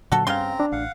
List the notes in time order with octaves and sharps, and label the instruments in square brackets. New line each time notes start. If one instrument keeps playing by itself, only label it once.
[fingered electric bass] A#2 D3 F#3 [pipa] F#4 A4
[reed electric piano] G2 F5 [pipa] C#3 C6 [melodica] C4 A#5 [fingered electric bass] C#4
[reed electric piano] D4
[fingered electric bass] A1 [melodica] F5 F#5